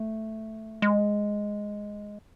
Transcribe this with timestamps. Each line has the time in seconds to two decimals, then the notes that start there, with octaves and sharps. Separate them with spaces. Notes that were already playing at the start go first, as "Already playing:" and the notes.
Already playing: A3
0.82 G#3